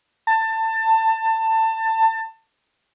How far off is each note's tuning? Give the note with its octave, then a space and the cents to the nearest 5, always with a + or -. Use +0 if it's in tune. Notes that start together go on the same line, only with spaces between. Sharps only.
A5 +25